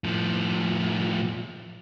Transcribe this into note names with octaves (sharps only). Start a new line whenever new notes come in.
A2 F3